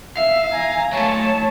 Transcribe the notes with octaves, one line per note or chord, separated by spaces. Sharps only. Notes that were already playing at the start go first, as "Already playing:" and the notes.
E5 F5
G#5 A#5
F#3 A3 C#5 A5